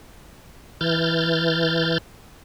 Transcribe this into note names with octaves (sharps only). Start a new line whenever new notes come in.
E3 F6 G6 A6